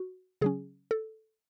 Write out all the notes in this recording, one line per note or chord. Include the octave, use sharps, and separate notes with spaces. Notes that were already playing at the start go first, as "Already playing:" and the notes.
Already playing: F#4
C#3 F#3 C#4 G#4
A4